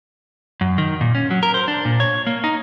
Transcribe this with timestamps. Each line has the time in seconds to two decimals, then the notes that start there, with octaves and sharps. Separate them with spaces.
0.61 F#2
0.78 D#3
1.01 A#2
1.15 C#4
1.31 F#3
1.43 A#4
1.54 C5
1.68 D4
1.85 A#2
2.00 C#5
2.27 A#3
2.44 D#4